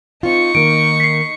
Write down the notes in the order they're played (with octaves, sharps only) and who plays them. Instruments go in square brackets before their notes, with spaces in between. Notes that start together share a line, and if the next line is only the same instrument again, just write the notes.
[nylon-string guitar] C4 F4 [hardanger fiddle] D#4 C#6
[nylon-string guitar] D#3 A#3 [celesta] D7
[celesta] B6 C7